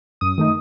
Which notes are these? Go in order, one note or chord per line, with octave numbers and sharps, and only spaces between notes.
F#2 D#6
D#3 A3 D#4